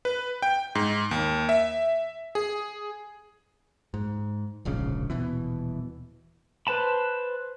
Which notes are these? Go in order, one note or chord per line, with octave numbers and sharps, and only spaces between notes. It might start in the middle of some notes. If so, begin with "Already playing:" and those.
B4
G5
G#2
D#2
E5
G#4
G#2
D1 A#1 G#2 C#3
D#1 A#1 B2 E3
B4 C5 A5 B5